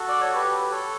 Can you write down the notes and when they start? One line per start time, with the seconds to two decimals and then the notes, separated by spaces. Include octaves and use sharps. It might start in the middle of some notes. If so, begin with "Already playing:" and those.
Already playing: F#4 A4
0.09 D5
0.21 C#5
0.34 G4 B4
0.62 B4
0.71 A4 C#5